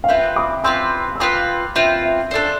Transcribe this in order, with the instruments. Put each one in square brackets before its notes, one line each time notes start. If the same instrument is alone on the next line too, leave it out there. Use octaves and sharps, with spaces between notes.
[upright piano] F5
[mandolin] C4 F4 B4 [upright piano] E5
[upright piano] B5 D6
[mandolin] C4 F4 B4 [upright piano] C6 E6
[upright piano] E6
[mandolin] C4 F4 B4 [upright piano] B5 D6
[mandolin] C4 F4 B4 [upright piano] E5
[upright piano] E5
[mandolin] D4 A4 C5 [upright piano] D5